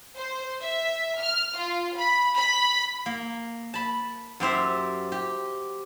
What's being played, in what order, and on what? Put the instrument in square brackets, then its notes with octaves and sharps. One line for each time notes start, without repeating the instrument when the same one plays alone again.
[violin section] C5
E5
F6
F4
B5
B5
[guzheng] A#3
A5 B5
F#2 G4 C5 E5
G4